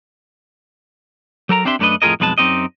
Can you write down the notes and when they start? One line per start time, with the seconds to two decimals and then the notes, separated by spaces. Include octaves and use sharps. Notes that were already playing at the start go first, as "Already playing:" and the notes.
1.49 F#3 A4 A#4 A#5
1.65 C4 D4 G4 E5 C6
1.79 F#2 A3 D4 A#4 B4 D#5
2.02 F2 A2 F4 G#4 A#4 D#5
2.20 B1 F2 G#3 B4 F5 A5
2.38 F#2 C4 D#4 G4 D#5